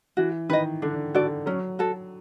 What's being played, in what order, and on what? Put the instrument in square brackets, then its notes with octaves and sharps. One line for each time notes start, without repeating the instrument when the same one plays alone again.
[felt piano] E3 [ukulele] F#4
[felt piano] D#3 [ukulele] B4 D#5
[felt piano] D3 [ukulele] D4
[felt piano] D3 [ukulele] F#4 A4 D5
[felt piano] F#3 [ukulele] C#4
[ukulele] F#4 A4